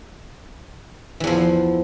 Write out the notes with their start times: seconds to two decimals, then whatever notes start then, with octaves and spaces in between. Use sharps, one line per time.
1.20 E3
1.24 E2
1.27 F3